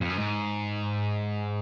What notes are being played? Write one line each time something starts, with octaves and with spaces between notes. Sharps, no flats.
F2
F#2
G#2